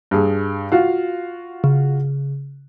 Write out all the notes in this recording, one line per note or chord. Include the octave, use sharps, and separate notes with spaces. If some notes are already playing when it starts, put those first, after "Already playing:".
G2 G#4
F4 F#4 F5
C#3